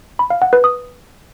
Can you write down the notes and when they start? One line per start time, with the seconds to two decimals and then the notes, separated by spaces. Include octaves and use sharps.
0.19 B5
0.30 F5
0.42 F#5
0.53 B4
0.64 D#6